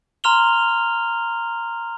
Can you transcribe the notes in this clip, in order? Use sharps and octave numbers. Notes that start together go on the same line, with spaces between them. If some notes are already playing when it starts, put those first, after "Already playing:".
A#5 C6 F6 F7 G7